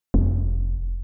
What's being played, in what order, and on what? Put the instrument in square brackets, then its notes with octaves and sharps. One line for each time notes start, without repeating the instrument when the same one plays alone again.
[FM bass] F1